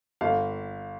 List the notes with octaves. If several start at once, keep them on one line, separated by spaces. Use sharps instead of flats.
G1 F5